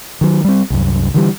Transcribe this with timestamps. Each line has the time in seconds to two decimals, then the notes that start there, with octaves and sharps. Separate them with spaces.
0.21 D#3 F#3
0.44 G3 C4
0.70 C2 F#2
1.14 D3 E3 G3